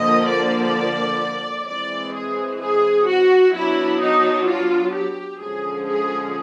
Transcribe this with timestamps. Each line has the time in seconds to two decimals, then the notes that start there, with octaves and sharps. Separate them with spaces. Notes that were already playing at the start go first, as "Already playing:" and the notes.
Already playing: D3 F3 A#3 D#5
0.27 D5
1.66 E3 G#3 C4 D5
2.13 G#4
2.60 G#4
3.06 F#4
3.53 F#3 B3 D4 E4
4.00 D#4
4.46 F4
4.93 G4
5.40 D3 F3 G#3 C#4 G#4
5.86 G#4